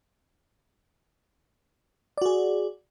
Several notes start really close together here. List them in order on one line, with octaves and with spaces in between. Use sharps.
D5 F#4 G#4